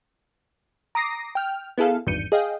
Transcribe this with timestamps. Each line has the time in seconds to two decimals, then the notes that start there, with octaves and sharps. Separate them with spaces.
0.95 A#5 D6 D#6 A#6 C7
1.35 G5 F6
1.78 B3 E4 G#4 A4 F5
2.07 G#1 E2 G2 G6 C#7 D#7
2.32 G#4 D#5 F5 G5